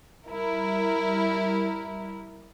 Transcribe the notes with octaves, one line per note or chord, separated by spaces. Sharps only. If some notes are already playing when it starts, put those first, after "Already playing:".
G3 E4 A#4